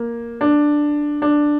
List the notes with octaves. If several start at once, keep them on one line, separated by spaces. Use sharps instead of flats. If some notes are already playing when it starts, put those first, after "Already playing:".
Already playing: A#3
D4
D4